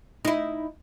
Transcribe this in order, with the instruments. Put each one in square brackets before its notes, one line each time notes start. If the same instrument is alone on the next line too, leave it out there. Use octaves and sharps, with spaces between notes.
[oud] D#4 E4